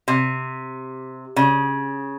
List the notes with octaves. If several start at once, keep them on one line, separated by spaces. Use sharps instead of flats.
C3
C#3